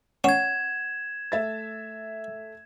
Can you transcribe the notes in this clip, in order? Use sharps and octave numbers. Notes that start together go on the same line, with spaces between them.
C#4 F#5 G#6 E7
A3 E5 A6